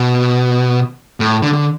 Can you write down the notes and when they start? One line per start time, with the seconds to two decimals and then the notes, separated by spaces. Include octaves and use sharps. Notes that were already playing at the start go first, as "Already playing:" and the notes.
Already playing: B2
1.20 A2
1.42 D3
1.53 D3